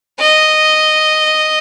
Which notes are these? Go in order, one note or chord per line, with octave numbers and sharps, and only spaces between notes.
D#5